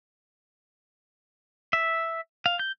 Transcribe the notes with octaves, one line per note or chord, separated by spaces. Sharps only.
E5
F5
G6